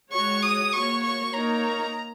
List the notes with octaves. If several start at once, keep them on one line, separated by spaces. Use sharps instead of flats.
G#3 F#4 C#5 C#6
D#6
A#3 F#4 C#5 C#6
C#6
A#3 D#4 A#4 C#5 A#5